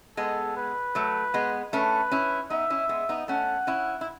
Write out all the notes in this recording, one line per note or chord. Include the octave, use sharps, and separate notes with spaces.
G#3 B3 A4
B4
F#3 A3
G#3 B3
A3 C#4 B4
C#4 E4
B3 D#4 E5
C#4 E4
G#3 B3
B3 D#4
A3 C#4 F#5
C#4 E4
E4